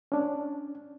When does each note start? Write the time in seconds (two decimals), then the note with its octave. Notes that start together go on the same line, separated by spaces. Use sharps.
0.12 C#4 D4